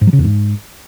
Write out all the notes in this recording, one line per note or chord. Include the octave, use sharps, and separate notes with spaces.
G#2
F#3
C#3
E2
G#2